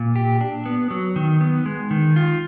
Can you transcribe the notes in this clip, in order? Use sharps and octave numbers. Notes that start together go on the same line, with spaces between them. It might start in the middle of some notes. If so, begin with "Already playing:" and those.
Already playing: A#2
G4
D4
B3
F#3
D#3
B3
G#3
D#3
F4